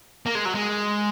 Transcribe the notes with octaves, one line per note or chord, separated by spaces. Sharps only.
A#3
G#3
F#3
G#3